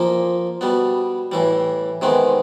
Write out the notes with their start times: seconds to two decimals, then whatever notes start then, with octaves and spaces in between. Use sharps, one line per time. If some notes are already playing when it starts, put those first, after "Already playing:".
Already playing: A#2 F3 A#3
0.61 B2 G3 B3
1.32 A2 E3 G3
2.02 C3 D#3 G#3 B3